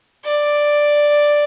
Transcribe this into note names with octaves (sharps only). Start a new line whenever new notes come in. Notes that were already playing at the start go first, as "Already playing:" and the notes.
D5